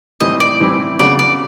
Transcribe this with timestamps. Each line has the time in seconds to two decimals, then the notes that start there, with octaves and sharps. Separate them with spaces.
0.20 A2 E3 G3 C4 E4 D#5
0.40 D5
0.60 A2 E3 G3 C4 E4
0.99 C#3 F#3 B3 D4 D5
1.19 D5